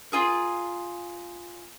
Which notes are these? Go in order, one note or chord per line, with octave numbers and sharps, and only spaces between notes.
F4 G#4 A#4